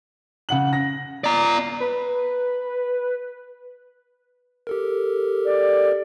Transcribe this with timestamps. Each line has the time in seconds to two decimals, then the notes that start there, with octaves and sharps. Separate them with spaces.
0.49 C#3 F#5 F#7
0.73 A#6
1.24 D5 A#5
1.80 B4
4.67 G4 A4 A#4
5.45 D5